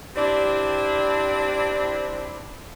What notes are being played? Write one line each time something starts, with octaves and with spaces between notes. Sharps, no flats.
C4 D4 E4 G4 D5